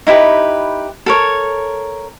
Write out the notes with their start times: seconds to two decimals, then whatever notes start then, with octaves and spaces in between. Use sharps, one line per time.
0.07 D#4 E4 G4 B4
1.06 A4 A#4 C#5